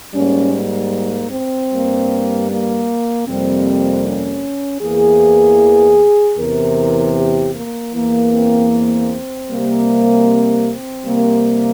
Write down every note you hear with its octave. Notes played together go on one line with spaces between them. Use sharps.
G#2 G3 A#3 C#4
A#3
C4
G2 G3 A#3
A#3
F2 C3 G3 A#3 C4
C#4
E2 E3 A#3 G#4
E2 C3 E3 A#4
G4
A#3
E2 E3 A#3
C4
C4
C3 G3 A#3
C4
C4
C3 G3 A#3